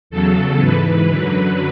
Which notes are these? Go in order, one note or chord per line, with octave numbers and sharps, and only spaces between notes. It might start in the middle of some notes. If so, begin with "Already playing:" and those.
E2 C#3 F#3 A4
G#2 E3 B4
F#2 D3 F#3